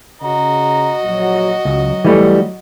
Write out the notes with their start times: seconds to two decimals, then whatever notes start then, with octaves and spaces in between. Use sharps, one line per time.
0.22 C#3 F#4 D#5 A#5
1.04 A#1 F#3
1.65 C#2 F#3
2.05 E3 G3 A3